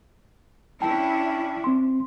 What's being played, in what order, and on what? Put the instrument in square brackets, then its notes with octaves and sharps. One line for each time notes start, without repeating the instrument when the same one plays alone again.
[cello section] C#4 D4 E4 [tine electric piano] G5 A5
[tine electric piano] C4 C6